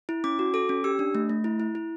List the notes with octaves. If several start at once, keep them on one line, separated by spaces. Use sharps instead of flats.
E4
C#4 D6
F#4
A4 D6
C#4
G4 E6
D4
A3
A3
E4
E4
E4